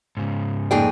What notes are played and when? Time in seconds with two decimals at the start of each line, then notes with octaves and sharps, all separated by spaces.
0.17 G#2 C#3
0.71 F2 A#3 D#4 G#4 D5 G5